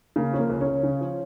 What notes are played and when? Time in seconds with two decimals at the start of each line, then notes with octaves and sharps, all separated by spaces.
0.16 C#3 A#3
0.33 F3 C#4
0.39 A#3
0.50 C#2
0.61 C#4
0.67 C#2
0.83 C#3
1.01 F3